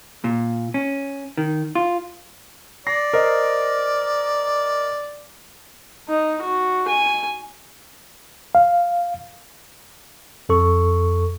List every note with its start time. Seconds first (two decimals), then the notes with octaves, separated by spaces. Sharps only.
0.24 A#2
0.74 C#4
1.37 D#3
1.75 F4
2.87 D5 A#6 C7
3.13 A#4 C5 D#5
6.08 D#4
6.42 F#4
6.88 G#5
8.55 F5
10.49 F2 A4 C#6